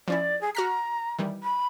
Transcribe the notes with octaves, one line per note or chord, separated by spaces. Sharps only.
F3 C#4 E4 D5
G#4
F#4 A#5 F6 B6
D#3 E3 G3
B5